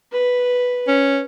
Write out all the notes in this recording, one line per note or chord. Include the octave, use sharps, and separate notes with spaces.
B4
C#4